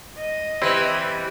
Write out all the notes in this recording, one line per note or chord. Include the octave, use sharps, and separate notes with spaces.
D#5
E3 G3 C4 E4